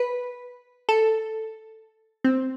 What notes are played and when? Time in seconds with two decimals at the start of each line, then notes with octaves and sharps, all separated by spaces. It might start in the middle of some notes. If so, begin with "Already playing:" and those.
Already playing: B4
0.89 A4
2.24 C4